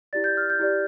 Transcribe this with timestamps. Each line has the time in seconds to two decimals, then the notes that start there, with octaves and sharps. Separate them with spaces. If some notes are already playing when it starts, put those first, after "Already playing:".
0.13 E4 G4 D5 A6
0.24 G6
0.37 F6
0.50 G6
0.59 E4 G4 D5